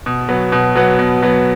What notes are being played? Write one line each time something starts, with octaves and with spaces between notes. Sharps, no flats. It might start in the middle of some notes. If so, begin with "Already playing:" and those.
B2
F#3 B3
B2
F#3 B3
B2
F#3 B3